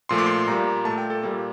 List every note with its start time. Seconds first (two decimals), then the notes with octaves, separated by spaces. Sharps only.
0.09 A#2 F3 A3 C6
0.18 D6
0.26 C6
0.48 A#2 G3 A#3 A#5
0.85 A3 A5
0.89 A#2
0.98 G5
1.10 A4
1.23 A#2 G3 A#3